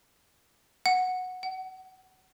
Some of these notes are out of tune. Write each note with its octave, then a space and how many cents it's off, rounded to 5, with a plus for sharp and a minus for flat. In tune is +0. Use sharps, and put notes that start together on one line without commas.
F#5 -10
F#5 +30